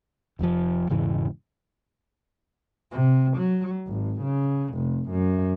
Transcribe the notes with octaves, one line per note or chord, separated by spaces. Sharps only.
F1 F2 A2 F3
E1 G#2 C#3 E3
C3
F#3
G#1
C#3
F1
F#2